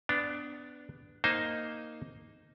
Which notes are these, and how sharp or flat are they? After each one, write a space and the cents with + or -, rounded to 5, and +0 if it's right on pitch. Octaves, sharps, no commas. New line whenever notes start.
B3 +20 D4 +0
A#3 +0 D#4 +0 C5 +0